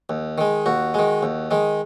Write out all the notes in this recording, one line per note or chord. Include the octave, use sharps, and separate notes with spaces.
D#2
D#3 G#3
D#2 F#4
D#3 G#3
D#2
D#3 G#3